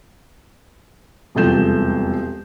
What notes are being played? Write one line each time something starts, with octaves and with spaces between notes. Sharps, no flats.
E1 C2 F2 A4 G6 E7